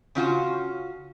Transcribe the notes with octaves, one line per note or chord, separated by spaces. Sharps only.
C#3 C#4 F4 F#4